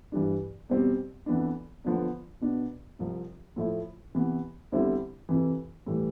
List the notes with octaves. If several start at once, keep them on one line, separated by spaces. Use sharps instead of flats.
G2 E3 G3 D4
E2 B2 G3 C4
F2 E3 B3 D4
E2 D3 F3 B3
B2 B3 D4
C2 C3 F3
A2 F3 A3 E4
C3 E3 B3
E2 D3 G3 C4 E4
F2 C3 E3
A2 E3 G3